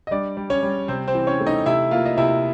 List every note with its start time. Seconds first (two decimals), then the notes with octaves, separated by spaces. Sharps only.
0.07 D#5
0.11 G3 D4 D5
0.37 G3
0.50 C#4 C#5
0.63 G3
0.88 C3 C4 C5
1.08 C4 C5
1.15 E3
1.27 C#4 C#5
1.40 A3
1.47 D#4 D#5
1.66 C3 E4 E5
1.91 A#3 F4 F5
2.06 D#5
2.17 C3 E4 E5